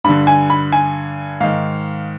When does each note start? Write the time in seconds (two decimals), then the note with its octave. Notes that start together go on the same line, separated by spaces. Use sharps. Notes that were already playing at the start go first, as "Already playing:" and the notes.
0.04 G2 D3 B5
0.27 G#5
0.50 B5
0.72 G#5
1.41 G#2 D#3 F5